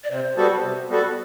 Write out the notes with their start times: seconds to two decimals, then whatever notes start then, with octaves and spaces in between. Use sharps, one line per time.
0.04 D5
0.10 C3 C5
0.37 G3 B3 F#4 A4
0.63 C3
0.89 G3 B3 F#4 A4